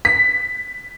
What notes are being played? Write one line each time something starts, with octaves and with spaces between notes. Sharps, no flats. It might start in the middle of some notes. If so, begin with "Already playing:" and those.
B6